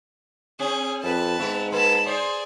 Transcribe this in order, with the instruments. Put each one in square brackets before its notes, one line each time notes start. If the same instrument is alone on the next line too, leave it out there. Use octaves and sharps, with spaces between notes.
[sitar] C4 [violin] G#4
[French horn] F2 [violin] B4 A5
[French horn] G#2 [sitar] B3 E5
[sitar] A#3 [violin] A5 B5
[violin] G#4 D5 [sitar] C5